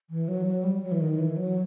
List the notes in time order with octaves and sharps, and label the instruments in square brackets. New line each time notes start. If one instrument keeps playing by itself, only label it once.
[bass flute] E3
F#3
F#3
G3
F#3
E3
D#3
E3
F#3